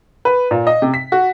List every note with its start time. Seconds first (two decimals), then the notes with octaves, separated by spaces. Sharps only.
0.25 B4
0.51 A#2
0.67 D#5
0.82 C3
0.94 B6
1.12 F#4